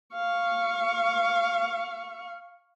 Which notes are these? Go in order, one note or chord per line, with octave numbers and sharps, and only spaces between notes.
F5 C#6